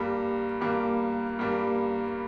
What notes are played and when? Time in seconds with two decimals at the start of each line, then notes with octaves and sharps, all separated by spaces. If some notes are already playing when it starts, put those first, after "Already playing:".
Already playing: G2 G3 A#3
0.61 G2 G3 A#3
1.39 G2 G3 A#3